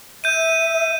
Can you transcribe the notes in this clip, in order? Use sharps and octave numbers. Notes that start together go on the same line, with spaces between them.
E5 G6 D#7